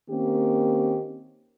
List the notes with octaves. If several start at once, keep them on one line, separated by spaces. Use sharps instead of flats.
D#3 A#3 C4 C#4 G4